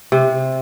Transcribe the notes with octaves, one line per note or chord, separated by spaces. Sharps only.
C3